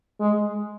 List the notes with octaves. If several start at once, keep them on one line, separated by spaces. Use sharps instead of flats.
G#3